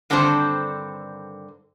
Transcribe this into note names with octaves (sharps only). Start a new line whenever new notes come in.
G2 D3 D#3 C4 A4 C5